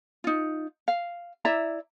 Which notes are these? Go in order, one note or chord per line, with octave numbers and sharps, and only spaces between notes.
D#4 F4
F5
E4 D5 E5 A#5